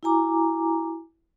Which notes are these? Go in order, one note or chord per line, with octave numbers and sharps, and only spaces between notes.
E4 F#4 G#5 A#5 D6